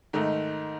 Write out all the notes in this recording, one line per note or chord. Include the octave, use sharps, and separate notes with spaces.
G#2 D#3 A3 D#4